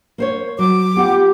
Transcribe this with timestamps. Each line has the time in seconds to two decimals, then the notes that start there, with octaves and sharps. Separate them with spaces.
0.18 A#3 C5 C#5
0.59 F#3 D6
0.96 B3 F4 G4 F#5